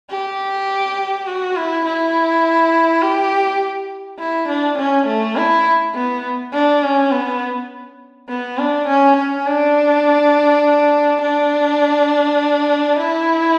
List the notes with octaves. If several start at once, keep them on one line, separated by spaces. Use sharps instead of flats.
G4
F#4
E4
E4
G4
E4
D4
C#4
A3
E4
B3
D4
C#4
B3
B3
D4
C#4
C#4
D4
D4
E4